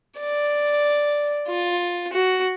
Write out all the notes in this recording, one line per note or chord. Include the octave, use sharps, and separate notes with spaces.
D5
F4
F#4